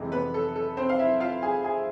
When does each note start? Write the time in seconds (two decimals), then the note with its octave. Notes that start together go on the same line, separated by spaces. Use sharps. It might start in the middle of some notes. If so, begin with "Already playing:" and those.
Already playing: F2 C3 E3 G#3
0.12 B3 B4
0.34 A4
0.56 A4
0.77 C4 C5
0.89 F5
0.99 E4 E5
1.20 F4 F5
1.42 G#4 G#5
1.64 G#4 G#5